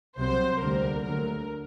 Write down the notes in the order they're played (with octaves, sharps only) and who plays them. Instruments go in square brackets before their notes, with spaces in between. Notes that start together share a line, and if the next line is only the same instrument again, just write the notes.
[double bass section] C2 C3 F#3 C4 [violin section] C5
[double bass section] D2 D3 G3 A#3 [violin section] A#4
[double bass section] D2 D3 F#3 [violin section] A#4